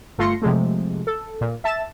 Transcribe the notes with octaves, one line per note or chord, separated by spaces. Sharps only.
G1 A3 F4 C6 A#6 C#7
C3 F3 G#3 A3
A4
A#2
E5 A5 A6 E7